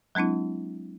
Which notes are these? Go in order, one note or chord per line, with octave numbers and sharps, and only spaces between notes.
F#3 G#3 C4 D4 E4